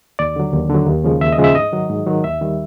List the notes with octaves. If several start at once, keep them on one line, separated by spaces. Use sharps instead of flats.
D#2 D5
D3 F#3
D#2
D3 F#3
D#2
C#3 F3 G#3
D#2 E5
D#5
C#3 F3 G#3
E5
G#2 D#5
D#3 F#3
G#2
D#3 F#3
D#2 E5
D#3 G3